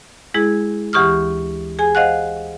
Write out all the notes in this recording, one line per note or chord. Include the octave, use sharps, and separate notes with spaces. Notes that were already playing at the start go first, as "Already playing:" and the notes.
G#3 E4 G#4
D2 E3 G4 C#6 D#6 F6
G#4 G#5
C5 D#5 F5 F#5 F#6